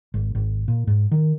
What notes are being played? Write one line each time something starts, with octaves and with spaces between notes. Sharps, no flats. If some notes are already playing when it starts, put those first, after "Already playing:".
G#1
G#1
A#2
G#2
D#3